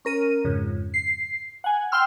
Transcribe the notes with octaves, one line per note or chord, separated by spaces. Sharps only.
C#4 A#4 D#7
F2 G#2 C#3
C7
F#5 G#5
G5 C6 E6 F6